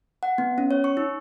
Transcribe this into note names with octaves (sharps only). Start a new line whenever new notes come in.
F#5
B3
C#4
C#5
C#6
D#4